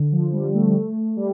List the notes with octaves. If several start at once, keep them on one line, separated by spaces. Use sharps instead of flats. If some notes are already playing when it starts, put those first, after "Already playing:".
Already playing: D3
F3
G3
A3
G3